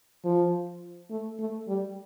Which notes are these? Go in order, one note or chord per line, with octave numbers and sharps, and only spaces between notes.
F3
A3
A3
G3